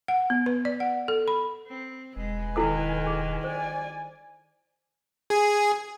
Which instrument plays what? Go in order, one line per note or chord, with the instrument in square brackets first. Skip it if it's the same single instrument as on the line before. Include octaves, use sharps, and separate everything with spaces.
[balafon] F#5
B3
B4
D5
F#5
A4
B5
[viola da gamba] C4
[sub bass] E1 [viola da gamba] G#3 [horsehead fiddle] B4 G#5
[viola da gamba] D#3 [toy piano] E4 A4 D#6
[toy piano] G#4
[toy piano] C5 [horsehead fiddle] D5 G#5
[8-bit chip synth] G#4